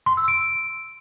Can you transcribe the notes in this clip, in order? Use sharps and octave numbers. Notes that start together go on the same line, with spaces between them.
C6
E6
D7